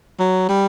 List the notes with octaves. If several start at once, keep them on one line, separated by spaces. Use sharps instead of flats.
F#3
G3